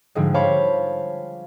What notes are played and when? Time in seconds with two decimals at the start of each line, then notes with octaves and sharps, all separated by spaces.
0.15 G#2 D3 F3 G3 G#3
0.34 C5 C#5 F5 A5 B5 D6